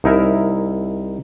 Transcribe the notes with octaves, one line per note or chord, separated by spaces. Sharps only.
C2 D#4 E4 A#4 E5